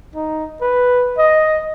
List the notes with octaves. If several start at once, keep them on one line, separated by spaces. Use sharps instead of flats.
D#4
B4
D#5